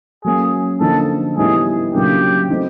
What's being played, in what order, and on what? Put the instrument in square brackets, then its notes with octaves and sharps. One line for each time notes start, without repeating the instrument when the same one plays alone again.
[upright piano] F#3 A#3 C#4 [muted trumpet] G#4
[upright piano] D3 F3 A#3 D#4 [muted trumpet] A4
[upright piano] A2 E3 G3 B3 D#4 [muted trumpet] G#4
[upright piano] C#3 F#3 A#3 D4 [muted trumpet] G4
[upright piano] F#3 A3 C4 D#4